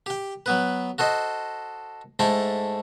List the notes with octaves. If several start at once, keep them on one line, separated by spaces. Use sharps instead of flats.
G4 G5
F#3 B3 B4
F#4 A4 C5 D#5
G#2 A3 E4 A4 G5